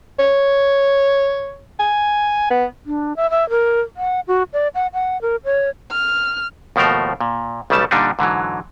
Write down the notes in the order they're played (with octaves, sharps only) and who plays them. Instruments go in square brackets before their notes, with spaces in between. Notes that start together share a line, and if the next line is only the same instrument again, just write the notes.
[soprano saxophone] C#5
G#5
B3
[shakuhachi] D4
E5
E5
A#4
F#5
F#4
D5
F#5
F#5
A#4
C#5
[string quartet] F6
[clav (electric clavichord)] D#2 B2 F3 A3 A#4 C5
A#2
B1 C#3 G3 A3 A5
A#2 D3 G3 D4 D#4
G#2 D3 E3 F#3